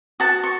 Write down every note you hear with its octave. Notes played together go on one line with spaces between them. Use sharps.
F#4 A5
C#6